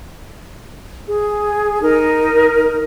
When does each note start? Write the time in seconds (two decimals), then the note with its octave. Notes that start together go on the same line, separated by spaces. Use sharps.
1.07 G#4
1.82 D#4 A#4